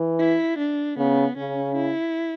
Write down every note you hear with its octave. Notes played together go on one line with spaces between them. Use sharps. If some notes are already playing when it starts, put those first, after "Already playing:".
Already playing: E3
E4
D4
C#3 B3
C#3 C#4
E4